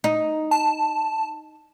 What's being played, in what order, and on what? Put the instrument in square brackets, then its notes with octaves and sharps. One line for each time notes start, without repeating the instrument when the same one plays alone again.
[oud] D#4
[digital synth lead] A5